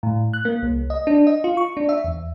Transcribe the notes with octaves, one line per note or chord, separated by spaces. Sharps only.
A2
F#6
A#3
C2
D#5
D4
D#5
F4
C#6
D4
E5
E2